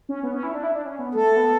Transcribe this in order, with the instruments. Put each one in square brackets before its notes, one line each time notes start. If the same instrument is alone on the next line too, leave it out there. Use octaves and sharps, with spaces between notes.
[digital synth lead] C#4
B3
C#4
E4
D4
E4
D4
C#4
B3
[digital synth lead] A3 [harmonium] A4
[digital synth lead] B3